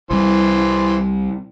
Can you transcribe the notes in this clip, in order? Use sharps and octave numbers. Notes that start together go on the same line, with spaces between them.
C2 E3 G3 C5